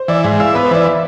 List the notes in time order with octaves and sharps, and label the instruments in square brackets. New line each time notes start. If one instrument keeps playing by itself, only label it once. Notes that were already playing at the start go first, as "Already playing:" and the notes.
Already playing: [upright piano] C5
[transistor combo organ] E3 [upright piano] D5
[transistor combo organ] G#2 [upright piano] E5
[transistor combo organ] E4 [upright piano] F5
[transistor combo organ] B3 [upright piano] B4
[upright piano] C5
[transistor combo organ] E3 [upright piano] D5
[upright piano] E5